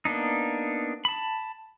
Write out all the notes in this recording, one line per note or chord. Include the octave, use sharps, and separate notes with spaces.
A#3 B3 D4 D#4
A5 B5